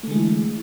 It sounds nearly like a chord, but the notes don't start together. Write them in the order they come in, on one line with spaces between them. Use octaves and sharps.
A3 D3 G#3 E3 E4